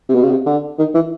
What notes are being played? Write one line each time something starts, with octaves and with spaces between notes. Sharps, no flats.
C3
B2
C#3
C3
D3
D#3
E3